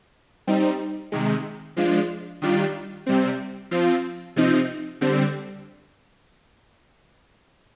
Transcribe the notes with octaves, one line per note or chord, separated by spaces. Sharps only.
G3 C4 D#4
C3 D#3 G#3
F3 G#3 D4 F4
D#3 G3 D4 F4
C3 G3 C4
F3 C4 F4
C3 F3 C4 D#4
D3 G3 C4